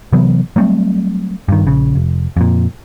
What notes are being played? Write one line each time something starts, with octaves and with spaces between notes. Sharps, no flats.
C3 E3 F#3 B3
F#3 G3 A3 C4
G2 D#3
A#1 C#3
F1
F2 A#2